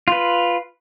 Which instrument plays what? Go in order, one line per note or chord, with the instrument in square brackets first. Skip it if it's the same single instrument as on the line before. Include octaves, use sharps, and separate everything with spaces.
[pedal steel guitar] F4 B4